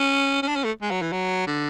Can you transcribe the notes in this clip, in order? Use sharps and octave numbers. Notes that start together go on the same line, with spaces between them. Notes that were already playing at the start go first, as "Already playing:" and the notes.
Already playing: C#4
C#4
D4
C#4
A3
G#3
F#3
E3
F#3
D3